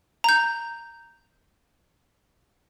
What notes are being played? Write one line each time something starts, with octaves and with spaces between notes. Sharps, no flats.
A#5 G6